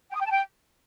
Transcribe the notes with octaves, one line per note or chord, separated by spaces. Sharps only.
G5
D#6
G5
A5
G5